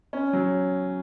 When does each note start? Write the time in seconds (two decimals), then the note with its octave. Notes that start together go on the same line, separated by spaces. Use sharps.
0.13 C#4
0.33 F#3